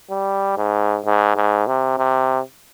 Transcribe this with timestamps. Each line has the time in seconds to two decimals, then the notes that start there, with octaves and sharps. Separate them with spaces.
0.10 G3
0.57 G#2
1.05 G#2
1.36 G#2
1.67 C3
1.98 C3